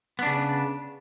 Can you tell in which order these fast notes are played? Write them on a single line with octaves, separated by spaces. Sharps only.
B3 D4 C#3